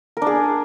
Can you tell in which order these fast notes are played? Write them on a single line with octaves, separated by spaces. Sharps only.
A#4 D4 G#4